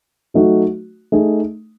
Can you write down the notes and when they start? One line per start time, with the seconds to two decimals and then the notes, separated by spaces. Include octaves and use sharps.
0.34 F#3 A3 D#4 F#4
1.12 A3 D#4 G#4